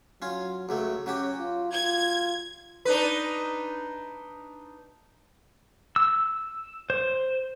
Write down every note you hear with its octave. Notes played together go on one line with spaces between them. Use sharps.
F#3 C#4 F4
C#2 F#3 A3 F#4
F#3 C#4 F#4 G4
F4
F4 G#6
D4 D#4 B4
E6
C5